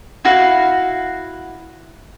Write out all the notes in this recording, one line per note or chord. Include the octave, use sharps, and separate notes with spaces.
E4 F#4 F5